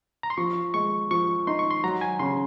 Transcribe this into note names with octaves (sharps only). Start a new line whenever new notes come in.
A#5
C6
F3 C#6
G#3 C#6
F3 C#6
D#4 C6
C#6
C6
F#3 A#5
G#5
C#3 C6